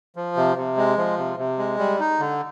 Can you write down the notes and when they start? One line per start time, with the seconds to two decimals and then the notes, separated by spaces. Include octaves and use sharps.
0.16 F3
0.36 C3
0.57 C3
0.77 G#3
0.97 F3
1.17 C3
1.38 C3
1.58 G#3
1.79 G3
1.99 D#4
2.20 D3